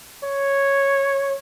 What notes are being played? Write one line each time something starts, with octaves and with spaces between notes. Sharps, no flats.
C#5